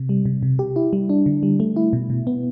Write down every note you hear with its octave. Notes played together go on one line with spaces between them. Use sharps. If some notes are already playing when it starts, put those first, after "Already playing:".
Already playing: C3
G3
C3
C3
G4
E4
G3
D4
D3
G3
A3
E4
B2
B2
B3